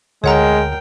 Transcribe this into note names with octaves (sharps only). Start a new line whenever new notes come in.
D2 G#3 A#4 C#5 F#5 G5 A#5